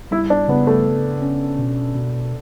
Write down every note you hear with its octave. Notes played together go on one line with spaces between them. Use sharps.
G3 E4
D4
C#3 B3
A3
C#3
C#4
B2
B2